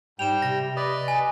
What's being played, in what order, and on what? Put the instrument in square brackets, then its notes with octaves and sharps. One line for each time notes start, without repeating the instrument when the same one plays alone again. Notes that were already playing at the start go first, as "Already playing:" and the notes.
[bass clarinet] G#2 [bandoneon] G3 G5 [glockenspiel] E7 F7
[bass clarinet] C3 [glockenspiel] A#6
[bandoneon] B4 D5 D#5
[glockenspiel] G#5